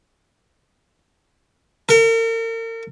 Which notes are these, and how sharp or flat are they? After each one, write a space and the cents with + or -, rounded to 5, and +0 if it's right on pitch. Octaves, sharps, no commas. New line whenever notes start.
A#4 -40